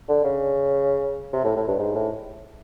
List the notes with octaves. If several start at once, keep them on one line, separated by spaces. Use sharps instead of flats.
D3
C#3
C3
A2
A2
G2
G#2
A2